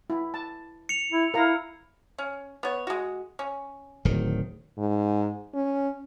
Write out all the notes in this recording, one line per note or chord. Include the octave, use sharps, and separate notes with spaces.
E4
A5
C#7 F7
E4
E4 A#4 F5 A#5
C#4
B3 C#5
G#3 F#4
C#4
D1 D#3
G#2
C#4